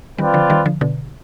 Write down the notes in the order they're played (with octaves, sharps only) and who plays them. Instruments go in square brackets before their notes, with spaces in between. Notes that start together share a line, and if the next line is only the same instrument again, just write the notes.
[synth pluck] D#3 G3 [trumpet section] C4 F4 B4 D5 G5
[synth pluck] D3 F3
D#3 G3
D3 F3
B2 D3